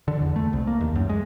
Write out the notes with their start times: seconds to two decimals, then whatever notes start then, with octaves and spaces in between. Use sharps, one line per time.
0.08 D3
0.22 E2
0.36 A3
0.53 C2
0.67 A#3
0.81 D#2
0.95 F#2
1.09 G#3